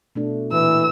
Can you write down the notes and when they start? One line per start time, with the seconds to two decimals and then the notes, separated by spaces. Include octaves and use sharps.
0.15 B2 A3 D4
0.52 A#2 E3 E6